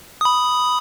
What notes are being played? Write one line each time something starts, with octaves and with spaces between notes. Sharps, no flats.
B5 D#6